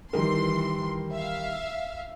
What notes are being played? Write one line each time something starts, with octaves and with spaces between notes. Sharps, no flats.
D#3 E3 G3 A#4 C6
E5 F5